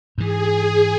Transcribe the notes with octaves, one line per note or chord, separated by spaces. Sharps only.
G#2 E3 G#4